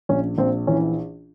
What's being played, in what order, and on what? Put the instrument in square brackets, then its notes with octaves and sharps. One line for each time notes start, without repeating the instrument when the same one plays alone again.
[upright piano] A#1 C#4
A#1 C4
E3 C#4